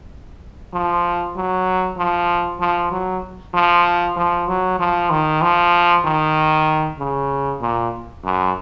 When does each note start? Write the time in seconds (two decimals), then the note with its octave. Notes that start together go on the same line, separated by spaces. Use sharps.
0.73 F3
1.36 F#3
1.98 F3
2.60 F3
2.92 F#3
3.54 F3
4.16 F3
4.48 F#3
4.79 F3
5.10 D#3
5.42 F3
6.05 D#3
6.99 C#3
7.61 A#2
8.24 F#2